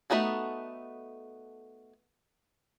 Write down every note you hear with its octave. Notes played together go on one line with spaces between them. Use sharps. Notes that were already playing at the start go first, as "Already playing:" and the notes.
A3 B3 D#4 F#4 A4